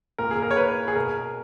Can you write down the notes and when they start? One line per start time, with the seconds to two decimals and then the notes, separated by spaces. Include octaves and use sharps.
0.18 A#2 A#4
0.31 G#4
0.42 A#4
0.51 C#5
0.57 B4
0.88 G#4
0.96 B2 A#4